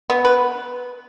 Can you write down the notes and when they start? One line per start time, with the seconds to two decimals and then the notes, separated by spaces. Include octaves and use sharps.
0.10 B3
0.25 B4